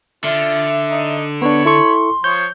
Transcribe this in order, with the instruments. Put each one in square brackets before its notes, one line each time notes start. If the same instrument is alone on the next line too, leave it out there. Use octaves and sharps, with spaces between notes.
[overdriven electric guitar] D3 [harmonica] F4 [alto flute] E5
[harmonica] D#4
[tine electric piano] B3 D4 [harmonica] C#5 B5
[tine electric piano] E4 A4 C#6 [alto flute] C6
[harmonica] F3 C#5 [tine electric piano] G6